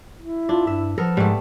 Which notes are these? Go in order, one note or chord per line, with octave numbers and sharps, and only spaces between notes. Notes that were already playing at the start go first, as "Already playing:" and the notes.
E4
D4 F4
G2 E5
F3 B3 A4 A#4
G#2 G3 A3